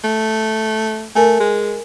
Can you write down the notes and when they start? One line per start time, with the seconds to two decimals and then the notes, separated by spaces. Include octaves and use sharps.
0.04 A3
1.16 A3 A#4 G#5
1.40 G#3